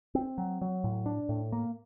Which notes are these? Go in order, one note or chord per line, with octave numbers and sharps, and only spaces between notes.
C4
F#3
F#3
A2
D4
A2
A#3